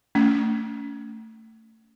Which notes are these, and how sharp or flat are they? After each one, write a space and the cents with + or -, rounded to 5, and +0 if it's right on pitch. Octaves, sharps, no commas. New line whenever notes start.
A3 +25 C#4 +25